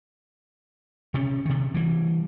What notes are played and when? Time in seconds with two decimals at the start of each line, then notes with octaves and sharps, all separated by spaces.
1.14 C3 C#4
1.45 C3 D#3
1.74 E3 G3